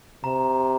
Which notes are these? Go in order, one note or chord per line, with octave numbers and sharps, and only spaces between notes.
C3 A#5